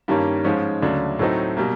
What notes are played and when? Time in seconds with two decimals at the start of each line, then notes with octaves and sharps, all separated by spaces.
0.08 G2 D#3 G3 A#3 C#4
0.44 G#2 F3 G#3 C#4
0.82 D2 C#3 F#3 A3 D4
1.19 A2 F#3 A3 C4 D#4
1.57 B2 G3 A#3